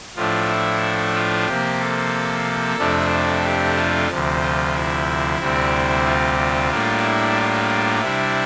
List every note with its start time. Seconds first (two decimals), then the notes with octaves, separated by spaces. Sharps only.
0.16 A2 F3 A3 D4 F4
0.49 E4
1.15 F4
1.47 C3 F3 A#3 G4
1.80 A4
2.78 F2 C3 F3 A3 D4
3.10 A4
3.44 G4
3.76 F4
4.09 D2 C3 F3
4.41 F4
4.74 E4
5.40 D2 C3 G3 C4
6.06 F4
6.38 F4
6.71 A2 G3 A#3 D4
7.03 E4
7.36 F4
8.01 C3 G3 D4 E4